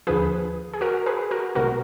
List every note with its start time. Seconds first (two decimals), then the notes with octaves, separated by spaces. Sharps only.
0.07 D#2 D3 F3 G#4 B4
0.73 G#4
0.81 F#4 A#4
1.06 G#4 B4
1.31 F#4 A#4
1.55 B1 B2 G#3 F#4 A#4